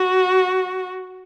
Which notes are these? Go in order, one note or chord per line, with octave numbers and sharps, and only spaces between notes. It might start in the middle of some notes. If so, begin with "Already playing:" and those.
Already playing: F#4